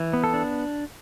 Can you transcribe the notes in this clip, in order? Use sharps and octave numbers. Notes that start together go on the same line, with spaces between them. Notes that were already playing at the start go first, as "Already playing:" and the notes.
Already playing: E3
B3
A4
D4